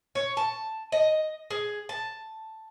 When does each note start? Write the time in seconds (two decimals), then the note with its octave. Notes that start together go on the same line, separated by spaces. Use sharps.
0.15 C#5
0.37 A5
0.92 D#5
1.50 G#4
1.89 A5